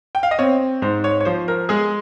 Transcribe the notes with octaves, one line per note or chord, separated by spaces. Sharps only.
G5
F5
D#5
C4 C#5
G#2 C5
C#5
C#5
F3 C5
A#4
G#3 G#4